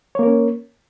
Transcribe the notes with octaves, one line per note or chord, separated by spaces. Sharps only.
A#3 C#4 A#4 C#5